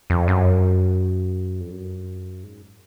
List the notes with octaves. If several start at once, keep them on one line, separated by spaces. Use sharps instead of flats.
F2
F#2
F2
F#2
G#2